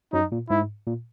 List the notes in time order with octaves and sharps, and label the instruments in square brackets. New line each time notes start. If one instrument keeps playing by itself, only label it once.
[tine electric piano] F#2 F#3 [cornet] D#4
[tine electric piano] A#2
[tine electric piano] G#2 [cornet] E4
[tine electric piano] A#2